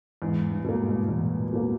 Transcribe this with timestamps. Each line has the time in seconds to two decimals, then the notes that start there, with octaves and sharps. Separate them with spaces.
0.22 E2 G#2
0.51 G2
0.64 B2 A#3
0.80 G#2
1.08 E2 A#2
1.53 B2 A#3